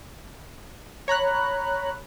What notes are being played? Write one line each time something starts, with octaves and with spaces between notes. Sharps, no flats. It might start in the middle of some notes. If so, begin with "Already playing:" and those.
C#5 A#5 B5 F#6